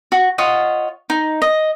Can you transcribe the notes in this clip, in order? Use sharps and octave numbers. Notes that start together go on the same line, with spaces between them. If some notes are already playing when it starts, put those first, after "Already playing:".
F#4
F4 C#5 D#5 F#5
D#4
D#5